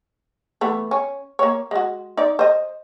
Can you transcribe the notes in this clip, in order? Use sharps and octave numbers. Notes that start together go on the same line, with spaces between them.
E3 A3 B3
C#4
A#3 C#5
G#3 F#4
D#4 D5
C5 D#5